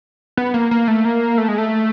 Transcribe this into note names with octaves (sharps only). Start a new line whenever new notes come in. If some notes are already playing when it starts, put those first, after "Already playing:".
B3
A#3
A#3
A3
A#3
A3
G#3
A3